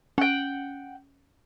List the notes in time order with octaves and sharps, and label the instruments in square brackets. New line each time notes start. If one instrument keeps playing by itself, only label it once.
[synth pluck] C#4 [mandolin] F#5 G5